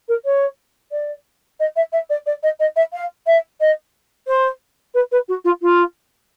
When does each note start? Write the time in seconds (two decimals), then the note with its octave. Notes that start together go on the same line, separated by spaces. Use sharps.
0.08 A#4
0.25 C#5
0.91 D5
1.60 D#5
1.76 E5
1.92 E5
2.10 D5
2.26 D5
2.43 D#5
2.60 D#5
2.76 E5
2.93 F5
3.26 E5
3.60 D#5
4.27 C5
4.94 B4
5.12 B4
5.28 F#4
5.44 F4
5.62 F4